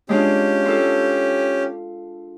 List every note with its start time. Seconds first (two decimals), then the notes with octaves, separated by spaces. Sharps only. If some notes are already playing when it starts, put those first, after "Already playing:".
0.09 G#3 C#4 D4 F4 G4
0.66 F4 A4